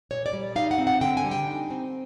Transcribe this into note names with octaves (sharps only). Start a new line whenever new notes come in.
A#2 C#5
D5
G3
D#4 F5
F#5
C4
F#5
D3 G5
G#5
G3
G5
D#4
C4